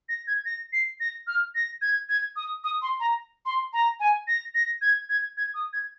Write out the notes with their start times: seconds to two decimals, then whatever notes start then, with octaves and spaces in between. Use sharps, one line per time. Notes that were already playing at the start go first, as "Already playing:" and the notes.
0.09 A#6
0.27 G#6
0.46 A#6
0.73 C7
1.00 A#6
1.27 F6
1.55 A#6
1.82 G#6
2.09 G#6
2.36 D#6
2.64 D#6
2.82 C6
3.00 A#5
3.46 C6
3.73 A#5
4.00 G#5
4.28 A#6
4.55 A#6
4.82 G#6
5.09 G#6
5.37 G#6
5.54 D#6
5.73 G#6